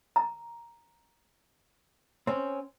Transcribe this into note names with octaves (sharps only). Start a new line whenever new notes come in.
A#5
C4 C#4